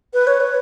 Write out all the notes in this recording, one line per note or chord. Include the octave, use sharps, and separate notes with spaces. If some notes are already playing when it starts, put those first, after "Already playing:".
B4
C#5
B4